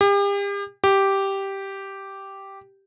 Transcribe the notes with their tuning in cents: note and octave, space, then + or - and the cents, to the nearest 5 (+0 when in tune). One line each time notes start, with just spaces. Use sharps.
G4 +40
G4 -5